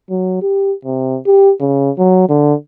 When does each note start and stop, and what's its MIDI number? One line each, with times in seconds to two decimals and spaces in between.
0.10 0.40 54
0.42 0.73 67
0.85 1.18 48
1.27 1.52 67
1.60 1.91 49
1.99 2.27 54
2.29 2.54 50